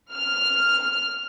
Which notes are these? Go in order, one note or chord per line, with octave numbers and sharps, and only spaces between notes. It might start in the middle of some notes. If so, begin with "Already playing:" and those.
F6